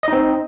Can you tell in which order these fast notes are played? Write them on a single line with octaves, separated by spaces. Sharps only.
D#5 D#4 C4